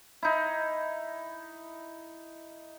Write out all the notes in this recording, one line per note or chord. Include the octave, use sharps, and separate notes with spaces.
D#4 E4